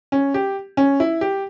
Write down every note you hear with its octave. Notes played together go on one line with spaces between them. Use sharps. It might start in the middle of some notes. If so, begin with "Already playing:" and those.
C#4
G4
C#4
E4
G4